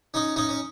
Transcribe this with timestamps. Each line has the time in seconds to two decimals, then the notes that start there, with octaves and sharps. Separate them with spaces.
0.14 C#4 D#4
0.36 C#4 D#4
0.49 C#4